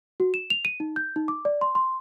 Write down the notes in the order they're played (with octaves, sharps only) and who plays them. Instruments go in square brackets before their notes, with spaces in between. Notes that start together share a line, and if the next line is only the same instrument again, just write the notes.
[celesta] F#4
E7
F7
D#7
D#4
G6
D#4
D6
D5
C6
C6